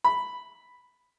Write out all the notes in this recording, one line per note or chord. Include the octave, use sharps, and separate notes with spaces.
B5